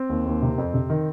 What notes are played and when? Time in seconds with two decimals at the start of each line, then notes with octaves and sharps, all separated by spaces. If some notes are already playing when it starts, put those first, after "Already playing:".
Already playing: C4
0.09 D#2
0.26 D#2
0.42 C3
0.58 F2
0.74 C3
0.90 D#3